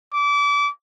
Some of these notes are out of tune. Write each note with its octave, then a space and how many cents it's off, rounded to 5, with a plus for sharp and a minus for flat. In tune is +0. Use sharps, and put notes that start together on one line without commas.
D6 -30